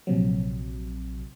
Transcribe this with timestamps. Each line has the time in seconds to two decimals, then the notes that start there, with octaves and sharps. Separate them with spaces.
0.07 A#1 C3 F#3